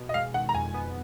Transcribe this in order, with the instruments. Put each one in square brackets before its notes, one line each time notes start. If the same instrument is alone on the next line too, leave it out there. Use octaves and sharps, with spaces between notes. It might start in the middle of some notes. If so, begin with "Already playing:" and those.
Already playing: [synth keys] B2
[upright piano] D#5
[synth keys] G#3 [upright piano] F5
[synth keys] D#3 [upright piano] F#5
[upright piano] A#5
[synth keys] F2 [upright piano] G#5
[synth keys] B3